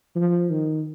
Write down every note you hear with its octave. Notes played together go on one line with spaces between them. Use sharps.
F3
D#3